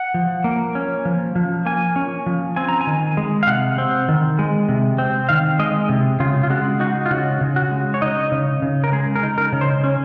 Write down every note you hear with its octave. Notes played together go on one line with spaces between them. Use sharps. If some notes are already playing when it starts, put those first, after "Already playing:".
Already playing: F#5
F3
A#3
C#4
F3
F3
A#3 G#5
C#4
F3
C4 G#5
A#5
G#5
D#3
G#3
F5
C3 F#5
C4
D#3
G#3
C3
C4
D#3 F5
G#3 D#5
C3
C#3 F4
F4
G#3 F#4
D#4 F#4
F4
C#3 F#4
C#3
F#4
G#3
C#5
D#4 D#5
C#3
C#3
A#4
G#3 G#4
A#4
D#4
A#4
C#3
C5
C#4